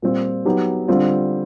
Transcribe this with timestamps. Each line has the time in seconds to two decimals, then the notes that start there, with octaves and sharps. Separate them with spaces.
0.02 A#2 G3 C4 F4
0.45 F#3 B3 D#4 G4
0.88 D3 G3 C4 F4